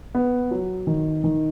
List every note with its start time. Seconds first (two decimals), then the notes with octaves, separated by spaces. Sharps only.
0.15 B3
0.51 F#3
0.87 D#3
1.24 D#3